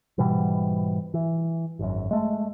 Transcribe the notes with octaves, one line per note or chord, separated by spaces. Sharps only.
G#2 B2 E3 G3
E3
G#1 F#2
G#3 A3